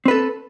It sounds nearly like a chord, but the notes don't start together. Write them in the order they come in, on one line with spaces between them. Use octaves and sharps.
C4 B4 A4